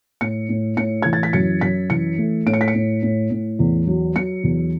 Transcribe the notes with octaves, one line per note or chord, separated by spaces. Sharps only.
A2 C#7
A2
A2 C#7
E3 G#6
A6
B6
F#2 C#7
F#2 B6
E3 C#7
A3
A2 D7
C#7
B6
C#7
A2
A2
A2
E2
F#3
F#3 C#7
E2